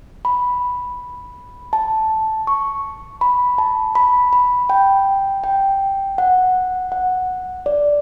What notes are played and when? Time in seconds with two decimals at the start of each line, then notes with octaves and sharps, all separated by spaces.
0.25 B5
1.73 A5
2.47 C#6
3.21 B5
3.58 A5
3.95 B5
4.33 B5
4.70 G5
5.44 G5
6.18 F#5
6.92 F#5
7.66 D5